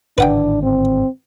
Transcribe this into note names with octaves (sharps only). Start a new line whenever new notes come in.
G#1 A2 D3 D4 B4 F#5 G5
C4